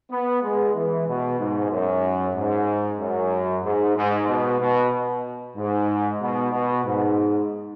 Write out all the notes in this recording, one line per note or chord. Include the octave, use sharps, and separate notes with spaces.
B3
G#3
E3
B2
G#2
F#2
G#2
F#2
G#2
G#2
B2
B2
G#2
B2
B2
G#2